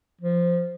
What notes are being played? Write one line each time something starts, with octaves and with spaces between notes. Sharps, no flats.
F3